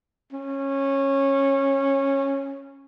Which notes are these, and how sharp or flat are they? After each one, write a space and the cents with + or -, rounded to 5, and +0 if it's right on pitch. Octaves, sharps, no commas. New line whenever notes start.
C#4 -15